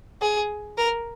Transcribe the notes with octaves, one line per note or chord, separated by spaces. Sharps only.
G#4
A#4